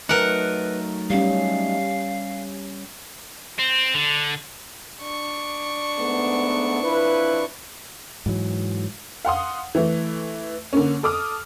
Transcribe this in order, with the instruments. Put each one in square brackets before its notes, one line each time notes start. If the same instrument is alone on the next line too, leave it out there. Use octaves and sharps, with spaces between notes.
[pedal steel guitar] F#3 A3 D#4 [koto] A#4 F#5 [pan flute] B4
[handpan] G3 C#4 [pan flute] F5
[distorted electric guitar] C4
D3
[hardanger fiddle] D4 C#6
[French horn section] G#2 A3 B3
F2 E4 B4
[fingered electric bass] G#2 E3 F#3
[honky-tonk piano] F5 F#5 C6 D#6
E3 A3
D3 A#3 C#4
A4 D6 D#6 F6